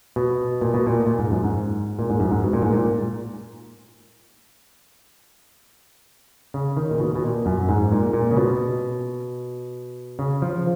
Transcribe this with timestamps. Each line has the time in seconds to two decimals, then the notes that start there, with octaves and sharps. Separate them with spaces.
0.16 B2
0.61 A#2
0.74 B2
0.87 A#2
1.07 A#2
1.19 G#2
1.31 F#2
1.44 G#2
1.99 A#2
2.10 G#2
2.20 F#2
2.31 G#2
2.44 B2
2.53 A#2
2.62 G#2
2.73 A#2
6.54 C#3
6.77 D#3
6.91 A#2
6.99 B2
7.15 B2
7.23 A#2
7.46 F#2
7.69 G#2
7.92 A#2
8.13 A#2
8.31 C#3
8.37 B2
10.19 C#3
10.42 F3